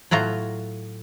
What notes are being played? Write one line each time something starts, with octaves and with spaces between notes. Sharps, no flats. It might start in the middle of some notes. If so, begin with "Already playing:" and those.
A2 F#3 F4 A#5